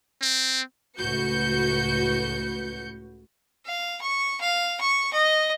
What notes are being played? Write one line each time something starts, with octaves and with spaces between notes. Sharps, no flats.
C4
C#2 A2 F#4 B4 G6 C#7
F5
C#6
F5
C#6
D#5